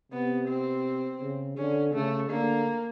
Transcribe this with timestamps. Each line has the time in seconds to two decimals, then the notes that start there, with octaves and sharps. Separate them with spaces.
0.12 C3 B3
0.49 C4
1.21 C#3
1.58 D3 C#4
1.93 C#3 A3
2.30 D3 A#3